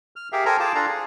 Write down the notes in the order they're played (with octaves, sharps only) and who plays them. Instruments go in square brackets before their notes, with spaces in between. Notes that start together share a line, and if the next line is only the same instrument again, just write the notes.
[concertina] F6
G4 G#4 A#4 E5 F5 G5
A4 A#4 C5 G5 G#5 A#5
F4 G#4 F5 G5 A5 D6
D4 F4 A4 D5 F5 A#5
G#4